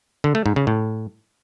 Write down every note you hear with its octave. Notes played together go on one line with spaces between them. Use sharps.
D3
A3
G#2
C#3
A2